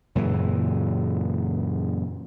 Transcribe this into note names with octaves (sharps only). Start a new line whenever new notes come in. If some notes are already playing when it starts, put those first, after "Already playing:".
F#2 A#2 C#3 E3